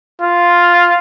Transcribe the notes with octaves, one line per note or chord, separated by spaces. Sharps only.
F4